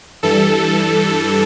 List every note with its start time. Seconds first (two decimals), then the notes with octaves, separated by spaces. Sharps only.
0.23 G2 E3 G3 A4